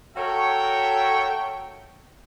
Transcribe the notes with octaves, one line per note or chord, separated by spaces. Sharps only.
F#4 A4 A#4 C#5 E5 G5